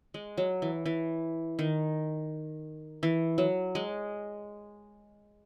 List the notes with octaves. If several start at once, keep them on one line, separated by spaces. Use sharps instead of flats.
G#3
F#3
E3
E3
D#3
E3
F#3
G#3